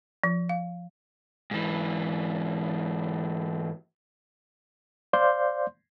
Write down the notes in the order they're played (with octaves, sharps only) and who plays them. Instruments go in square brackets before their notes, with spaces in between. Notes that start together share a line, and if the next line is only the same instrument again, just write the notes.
[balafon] F3
F5
[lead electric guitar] G#2 E3
[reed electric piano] C5 D5 F5 C6 G6